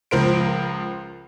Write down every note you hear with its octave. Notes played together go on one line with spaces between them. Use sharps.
C#2 F3 A#4 C5 D7